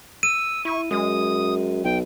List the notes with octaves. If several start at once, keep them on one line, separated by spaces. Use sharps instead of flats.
E6 D#7
E4 C#6
F#2 G#3 D#6
B1 G5